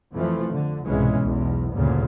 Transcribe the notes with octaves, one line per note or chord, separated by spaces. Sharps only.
F2 E3 F3 A3
D3
C2 G#2 B2 E3 G#3 C#4
B1 E2
D2 G2 A#2 C#3